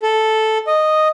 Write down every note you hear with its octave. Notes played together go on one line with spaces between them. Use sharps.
A4
D#5